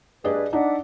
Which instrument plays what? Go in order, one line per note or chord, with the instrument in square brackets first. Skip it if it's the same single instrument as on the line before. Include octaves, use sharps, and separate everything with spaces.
[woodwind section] G2 B4 [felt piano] G#4 D5 D#5
[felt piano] D4 D#4 [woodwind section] D5 E5 F#5